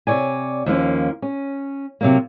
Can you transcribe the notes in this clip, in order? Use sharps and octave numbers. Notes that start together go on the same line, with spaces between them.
C3 C#5 D5 G#5
D#2 F3 A#3 C#4
C#4
C3 F#3 A#3